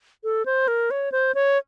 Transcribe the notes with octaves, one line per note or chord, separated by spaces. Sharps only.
A4
C5
A#4
C#5
C5
C#5